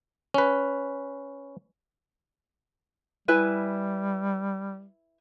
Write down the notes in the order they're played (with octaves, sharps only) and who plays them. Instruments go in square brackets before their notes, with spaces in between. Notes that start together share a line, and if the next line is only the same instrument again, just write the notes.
[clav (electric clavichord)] C#4 B4
[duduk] G3 [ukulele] E4 B4 G#5